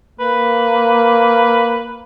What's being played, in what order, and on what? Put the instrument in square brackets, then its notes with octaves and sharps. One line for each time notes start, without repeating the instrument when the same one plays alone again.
[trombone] A#3 [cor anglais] B4